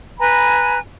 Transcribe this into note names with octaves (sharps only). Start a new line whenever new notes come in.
B4 G#5 A#5 B5